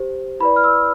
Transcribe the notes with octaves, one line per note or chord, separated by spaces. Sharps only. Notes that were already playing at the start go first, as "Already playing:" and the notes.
Already playing: G4 C5
E4 B4 D5 B5
F6
E6